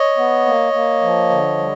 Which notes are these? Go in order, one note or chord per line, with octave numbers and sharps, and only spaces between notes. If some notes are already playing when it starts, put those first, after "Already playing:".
Already playing: C#5 D#5
B3
A#3
A#3
F3
D3
G3